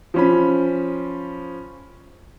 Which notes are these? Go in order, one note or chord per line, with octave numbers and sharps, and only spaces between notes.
F3 C#4 B5